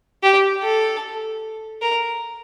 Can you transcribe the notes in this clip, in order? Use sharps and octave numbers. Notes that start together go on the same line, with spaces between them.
G4
A4
A#4